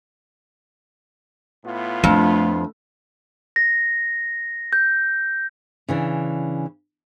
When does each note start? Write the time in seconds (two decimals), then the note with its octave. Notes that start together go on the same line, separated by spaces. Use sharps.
1.65 A2 B3 F4
2.04 F2 A3 D4
3.56 A#6
4.73 G6
5.89 C#3 E3 D4